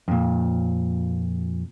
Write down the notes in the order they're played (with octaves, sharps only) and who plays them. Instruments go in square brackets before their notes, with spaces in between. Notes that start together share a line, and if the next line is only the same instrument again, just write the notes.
[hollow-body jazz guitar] F2 A#2